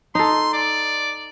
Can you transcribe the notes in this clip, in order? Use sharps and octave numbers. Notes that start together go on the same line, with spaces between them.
D#4 A4 C6
D5